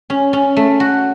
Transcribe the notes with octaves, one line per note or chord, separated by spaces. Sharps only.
C#4
C#4
A3
F#4